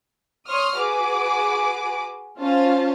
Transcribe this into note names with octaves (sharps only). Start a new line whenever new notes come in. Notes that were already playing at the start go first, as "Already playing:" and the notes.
C#5 C6 C#6 D#6 F6
F#4 G#4 B4 D6
C#4 F4 C5 F5 A5